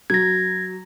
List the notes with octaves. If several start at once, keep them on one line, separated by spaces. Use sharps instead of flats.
F#3 G#6 A#6